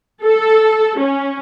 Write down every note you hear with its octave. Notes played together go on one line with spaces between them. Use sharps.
A4
C#4